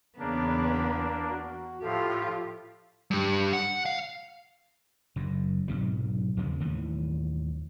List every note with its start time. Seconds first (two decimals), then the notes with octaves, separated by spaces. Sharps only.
0.19 E2 C#3 A#3 B3 D4
1.31 F#4
1.82 A2 F3 F4 G4 A4
3.11 G2 G3
3.53 F#5
3.86 F5
5.16 F#1 F#2
5.68 B1 G#2 C3 F#3
6.37 E2 C#3 F3 G#3
6.60 D#2 A2 D#3 E3